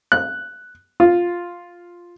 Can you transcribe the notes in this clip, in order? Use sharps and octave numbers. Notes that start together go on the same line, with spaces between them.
F#6
F4